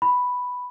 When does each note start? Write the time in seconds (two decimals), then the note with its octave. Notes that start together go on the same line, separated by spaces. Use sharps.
0.02 B5